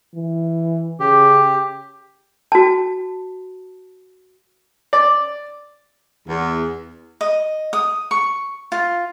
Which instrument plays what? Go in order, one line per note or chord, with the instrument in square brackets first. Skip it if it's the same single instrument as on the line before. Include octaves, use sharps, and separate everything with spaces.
[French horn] E3
[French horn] C#3 [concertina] G4
[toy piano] F#4 A5
[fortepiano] D5
[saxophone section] E2
[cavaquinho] D#5
D#6
C#6
F4